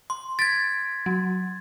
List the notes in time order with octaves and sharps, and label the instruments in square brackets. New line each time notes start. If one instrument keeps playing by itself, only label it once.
[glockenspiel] C6
[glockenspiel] G#6 A6 [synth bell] B6 D7
[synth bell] F#3